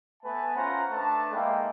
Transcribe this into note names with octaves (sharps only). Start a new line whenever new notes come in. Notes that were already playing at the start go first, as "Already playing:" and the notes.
A3 B3 B4 E5 G#5 A5
C#4 F4 C5 F#5 A#5
A3 D4 B4 A5
G#3 A#3 D#4 E5 F5 G5